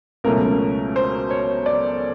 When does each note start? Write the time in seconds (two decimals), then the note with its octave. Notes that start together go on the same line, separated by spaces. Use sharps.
0.24 C#2 B2 F#3 A3 C#4 A#4
0.96 C5
1.30 C#5
1.66 D5